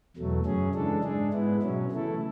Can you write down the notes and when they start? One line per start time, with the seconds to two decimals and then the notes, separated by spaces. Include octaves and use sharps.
0.16 E2 B2 F#3 A3
0.46 F#2 C#3 F#3 C#4 G#4
0.74 C#3 E3 G#3 D4 A4
1.04 G#2 G#3 D4 G#4
1.33 G#2 G#3 B3 E4
1.62 B2 F#3 C#4
1.91 C#3 E3 A3 E4 A4